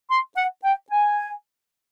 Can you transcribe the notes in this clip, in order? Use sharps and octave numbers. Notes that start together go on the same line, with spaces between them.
C6
F#5
G5
G#5